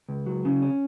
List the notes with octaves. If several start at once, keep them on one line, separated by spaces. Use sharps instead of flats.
C#2
F#3
C#3
C#4